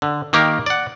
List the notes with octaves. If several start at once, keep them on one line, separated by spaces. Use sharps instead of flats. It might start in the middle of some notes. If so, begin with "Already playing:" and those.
D3
D#3 A#3 G4 A#4
D5 F#5